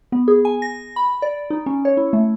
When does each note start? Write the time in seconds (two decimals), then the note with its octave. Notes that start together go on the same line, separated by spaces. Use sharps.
0.12 B3
0.28 G#4
0.45 G#5
0.62 A#6
0.96 B5
1.22 D5
1.50 D#4
1.66 C#4
1.85 C#5
1.97 E4
2.13 A3